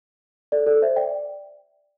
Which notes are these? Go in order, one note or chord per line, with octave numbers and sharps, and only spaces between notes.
A4 D5
A4 D5
C5 E5
D5 G5